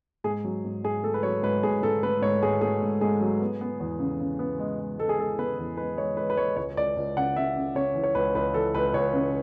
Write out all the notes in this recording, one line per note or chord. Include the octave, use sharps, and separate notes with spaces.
G#2 G#4
F#3
G#2
G#2 G#4
A3 A4
B4
F#3 C#5
G#2 B4
G#2 G#4
G#2 A4
A3 B4
G#2 C#5
G#2 G#4
A3 G#4
G#2
G#2 G#4
F#3
B3
B3
E2
C#3
C#3
B3
G#3
G#3
G#3 A4
G#4
G#3 A4
B3 B4
E2
G#3 B4
G#3 C#5
G#3 B4
B4
G#3 C#5
C#2 C#5
C#2 D5
C#2
C#3 F#5
C#3 E5
C#3
C#3 C#5
E3
C#5
C#2 B4
C#2 B4
E3 A4
C#2 B4
C#2 C#5
C#3